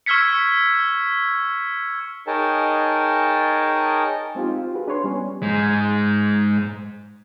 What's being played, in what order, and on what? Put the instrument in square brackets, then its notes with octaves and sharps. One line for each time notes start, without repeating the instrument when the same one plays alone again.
[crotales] C#6 E6 F6 G#6 B6 C#7
[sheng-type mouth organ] D#4 G#4 A#4 C#5 G5 A5
[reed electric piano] G#3 C4 D#4 F4 G4
F4
F#4 G#4 B4
D4 B4 C#5 C6
G3 B3 C#4
[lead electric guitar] G#2 G#3